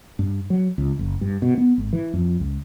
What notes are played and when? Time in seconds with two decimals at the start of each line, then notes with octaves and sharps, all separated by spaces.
0.19 G2
0.50 F#3
0.78 C#2
0.99 F#1
1.21 G2
1.42 B2
1.58 B3
1.78 G#1
1.93 E3
2.14 F2
2.40 C#2